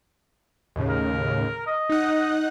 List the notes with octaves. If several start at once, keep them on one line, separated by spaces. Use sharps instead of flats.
D#2 A2 C#3
A#4
D#5
D#4 F#5